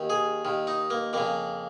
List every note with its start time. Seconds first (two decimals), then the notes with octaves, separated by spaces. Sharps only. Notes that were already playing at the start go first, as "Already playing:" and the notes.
Already playing: D#2 D#3
0.10 G#4
0.45 D#2 D#3
0.67 D#4
0.90 A#3
1.13 F2 C#3 A#3